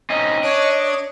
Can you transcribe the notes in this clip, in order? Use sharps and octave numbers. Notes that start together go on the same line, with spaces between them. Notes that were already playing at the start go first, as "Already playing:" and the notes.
C4 C#4 D#4 D#5
D4 C#5